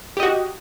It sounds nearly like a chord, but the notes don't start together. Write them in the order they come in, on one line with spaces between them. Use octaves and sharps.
G4 D#5 F#4